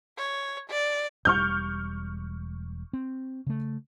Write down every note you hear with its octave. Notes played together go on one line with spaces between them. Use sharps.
C#5
D5
E1 G3 C#6 F6 G6
C4
C#3 A3